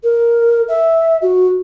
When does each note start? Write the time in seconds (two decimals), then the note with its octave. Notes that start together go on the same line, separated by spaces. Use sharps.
0.03 A#4
0.68 E5
1.21 F#4